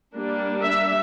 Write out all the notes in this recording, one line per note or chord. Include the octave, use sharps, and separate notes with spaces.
G3 A#3 D4
E5